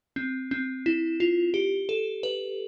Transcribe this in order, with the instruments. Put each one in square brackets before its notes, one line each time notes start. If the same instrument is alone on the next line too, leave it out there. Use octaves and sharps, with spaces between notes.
[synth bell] C4
C4
E4
F4
G4
A4
B4